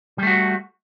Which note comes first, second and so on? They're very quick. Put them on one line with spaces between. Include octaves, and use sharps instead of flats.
G3 A3 F#4